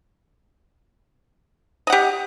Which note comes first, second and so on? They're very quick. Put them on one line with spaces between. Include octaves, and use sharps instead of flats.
D#5 F#5 G4